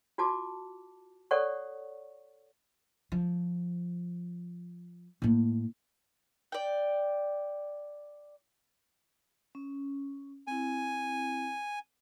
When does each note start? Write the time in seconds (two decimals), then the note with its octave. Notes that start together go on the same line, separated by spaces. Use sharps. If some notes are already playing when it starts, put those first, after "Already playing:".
0.18 F4 F#4 A5 D6
1.31 A4 C#5 D5 F#5 C#6
3.12 F3
5.22 A2 A#3
6.52 D5 G5
9.55 C#4
10.47 C4 E4 G#5